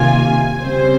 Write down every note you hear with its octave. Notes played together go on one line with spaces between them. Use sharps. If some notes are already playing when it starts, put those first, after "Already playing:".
Already playing: C3 D#3 A#3 F4 G#5
C#3 G3 C4 C5